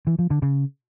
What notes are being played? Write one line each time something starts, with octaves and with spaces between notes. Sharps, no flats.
E3
F3
D3
C#3